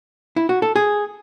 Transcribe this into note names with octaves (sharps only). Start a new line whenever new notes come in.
E4
F#4
A4
G#4